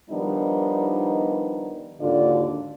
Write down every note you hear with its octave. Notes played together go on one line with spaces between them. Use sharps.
D#3 F3 G3 B3 D4 D#4
D#2 G#2 D3 F4 F#4 D5